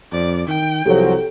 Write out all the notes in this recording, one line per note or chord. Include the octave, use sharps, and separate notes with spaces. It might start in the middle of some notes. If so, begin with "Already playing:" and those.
F2 D5
D#3 G5
C2 F3 F#3 G4 A4